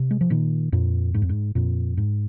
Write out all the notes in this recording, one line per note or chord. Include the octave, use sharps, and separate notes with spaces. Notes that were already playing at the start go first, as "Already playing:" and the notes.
Already playing: C3
G#3
F3
A#2 D#3
F2 A#2
G#2
F2
G#2
F2 A#2
G#2